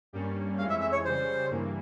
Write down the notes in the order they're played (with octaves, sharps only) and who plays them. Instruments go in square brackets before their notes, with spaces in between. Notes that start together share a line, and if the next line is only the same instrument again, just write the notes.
[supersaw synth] G2 G3 A#3 C#4
[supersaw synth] F2 E3 G#3 C#4 [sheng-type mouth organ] F5
[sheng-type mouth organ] E5
E5
C#5
[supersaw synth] C#3 G3 C#4 [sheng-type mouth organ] C5
[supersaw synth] G2 E3 A#3